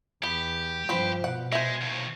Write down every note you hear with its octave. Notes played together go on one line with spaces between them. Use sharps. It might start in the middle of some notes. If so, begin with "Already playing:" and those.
E2 B3 G4
G2 F3 C4 B4 C5
B2 F#5
G#3 C5 E5
D#2 A2